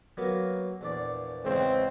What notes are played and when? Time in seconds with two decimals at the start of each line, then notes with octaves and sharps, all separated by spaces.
0.17 F#3 A#3 B3
0.81 A#1 E2 D5
1.44 E2 G#2 C#3 C4